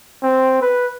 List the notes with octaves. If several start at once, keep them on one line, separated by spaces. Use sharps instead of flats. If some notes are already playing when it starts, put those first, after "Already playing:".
C4
B4